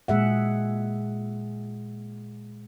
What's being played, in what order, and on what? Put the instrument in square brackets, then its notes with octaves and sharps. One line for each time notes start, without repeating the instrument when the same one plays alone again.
[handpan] A#2 G#3 G#4 E5 F#5